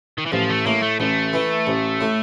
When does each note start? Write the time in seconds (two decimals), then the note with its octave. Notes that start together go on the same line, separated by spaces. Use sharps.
0.18 D#3
0.26 E3
0.32 A1 F3
0.49 A3
0.66 A2 A#3
0.83 A3
1.00 A1 A3
1.33 E3
1.67 A1
2.01 A2